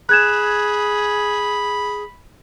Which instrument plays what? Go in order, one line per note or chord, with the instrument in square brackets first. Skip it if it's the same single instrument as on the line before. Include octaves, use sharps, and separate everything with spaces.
[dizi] G#4 [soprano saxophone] B5 [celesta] F#6 G#6 E7